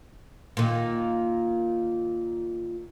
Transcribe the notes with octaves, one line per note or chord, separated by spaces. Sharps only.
A#2 D#3